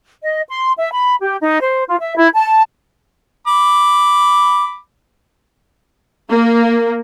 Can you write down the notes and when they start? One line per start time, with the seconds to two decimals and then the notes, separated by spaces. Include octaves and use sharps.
0.23 D#5
0.49 C6
0.77 E5
0.92 B5
1.20 G4
1.42 D#4
1.61 C5
1.88 F4
2.01 E5
2.16 E4
2.34 A5
3.47 B5 D6
6.31 A#3